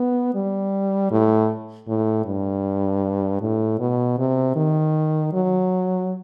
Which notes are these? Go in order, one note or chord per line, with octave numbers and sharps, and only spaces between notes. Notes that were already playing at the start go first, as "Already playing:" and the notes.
Already playing: B3
G3
A2
A2
G2
A2
B2
C3
D#3
F#3